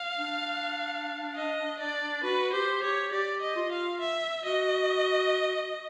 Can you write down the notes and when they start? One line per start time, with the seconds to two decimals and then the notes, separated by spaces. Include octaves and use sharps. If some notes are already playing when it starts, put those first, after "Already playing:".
Already playing: F5
0.18 D4
1.35 D#5
1.79 D5
2.23 F#4 B4
2.53 G4 C5
2.83 G4 C#5
3.12 G4 D5
3.42 D#5
3.56 F4
3.72 F5
4.01 E5
4.44 F#4 D#5